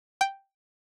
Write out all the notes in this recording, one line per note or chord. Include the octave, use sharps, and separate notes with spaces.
G5